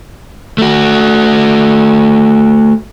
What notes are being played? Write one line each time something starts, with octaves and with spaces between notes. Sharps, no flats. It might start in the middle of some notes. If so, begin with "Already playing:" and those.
A3 F#4